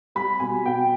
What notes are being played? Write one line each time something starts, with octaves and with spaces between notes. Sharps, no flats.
G3 B5
B2 G#5
B2 G5